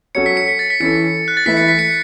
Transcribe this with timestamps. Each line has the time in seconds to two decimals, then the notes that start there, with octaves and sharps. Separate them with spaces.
0.15 F#3 C#4 F#4 A4 C#5 C#7
0.26 B6
0.37 C#7
0.48 B6
0.59 A6
0.70 B6
0.80 E3 C#4 E4 A4 C#7
1.28 F#6
1.37 A6
1.46 E3 A3 E4 B4 E5 B6
1.57 C#7
1.68 B6
1.79 C#7